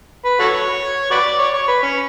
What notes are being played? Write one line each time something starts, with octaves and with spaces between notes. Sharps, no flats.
B4
F#4 A4 C#5
F#4 B4 D5
C#5
C#5
B4
C#4